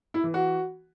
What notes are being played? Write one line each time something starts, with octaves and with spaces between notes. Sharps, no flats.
E4
E3
F#4